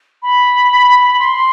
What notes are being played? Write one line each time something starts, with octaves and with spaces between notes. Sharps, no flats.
B5
B5
C6